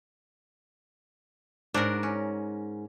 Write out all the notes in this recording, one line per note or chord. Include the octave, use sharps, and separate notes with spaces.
G#2 D4 F#4 A#4
C#4